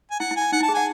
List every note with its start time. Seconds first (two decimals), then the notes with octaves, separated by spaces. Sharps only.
0.11 G#5
0.20 E4 F#5
0.31 E4
0.36 G#5
0.41 E4
0.52 D#4 F#5
0.60 E4 A5
0.69 G#4
0.74 F#5 G#5